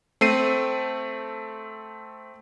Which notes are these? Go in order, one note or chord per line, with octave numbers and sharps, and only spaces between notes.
A3 C4 C7 D#7